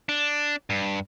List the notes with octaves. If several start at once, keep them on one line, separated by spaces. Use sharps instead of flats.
D4
G2